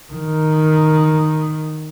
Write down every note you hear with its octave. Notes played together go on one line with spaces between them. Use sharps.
D#3